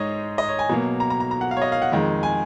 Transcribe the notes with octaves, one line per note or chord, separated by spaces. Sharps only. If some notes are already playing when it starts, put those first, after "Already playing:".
Already playing: G#2 G#3 D#4 C#5 D#5
D#5
C#5
G#5
B2 F#3 A#3
A#5
A#5
A#5
A#5
F#5
F5
C#5
D#5
F5
F#5
F2 D#3 G#3
G#5